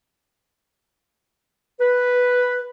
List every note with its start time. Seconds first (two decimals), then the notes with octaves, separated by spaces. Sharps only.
1.80 B4